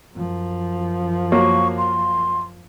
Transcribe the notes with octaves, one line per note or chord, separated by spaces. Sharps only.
F#2 F3
F#3 A#3 C#6
C6